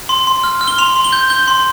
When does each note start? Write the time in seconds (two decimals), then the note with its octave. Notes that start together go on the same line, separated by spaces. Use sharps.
0.09 C6
0.27 C6
0.44 F6
0.61 F6
0.68 G7
0.78 C6 F7
0.96 C6
1.04 G7
1.13 G6
1.30 G6 G7
1.48 C6